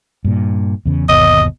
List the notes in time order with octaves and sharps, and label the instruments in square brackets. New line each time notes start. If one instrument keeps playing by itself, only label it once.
[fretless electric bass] G2 A#2
E2 C#3
[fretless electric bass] G1 D#2 B2 [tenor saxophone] D#5